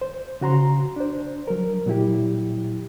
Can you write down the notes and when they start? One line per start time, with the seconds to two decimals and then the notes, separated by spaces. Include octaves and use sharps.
0.01 C5
0.41 C#3 F#4 A#5 C6
0.96 D4 C5
1.48 F#3 A#4
1.86 A#2 F#3 E4 G4